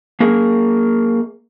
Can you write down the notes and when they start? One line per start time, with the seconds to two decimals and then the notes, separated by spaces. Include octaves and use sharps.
0.20 A#3 G#4 A#4